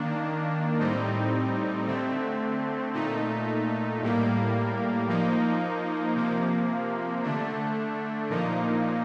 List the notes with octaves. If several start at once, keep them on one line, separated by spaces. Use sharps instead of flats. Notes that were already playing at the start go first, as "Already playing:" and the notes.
Already playing: D#3 A#3 D4
A2 G3 C4 D#4
D3 A3 C4
A#2 A3 D#4
A2 G3 A#3
F3 A#3 D#4
C3 F3 A#3
D3 A3 D4
A#2 F3 A#3 D#4